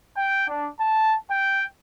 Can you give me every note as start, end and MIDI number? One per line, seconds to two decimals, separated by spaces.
0.16 0.47 79
0.48 0.68 62
0.79 1.15 81
1.29 1.64 79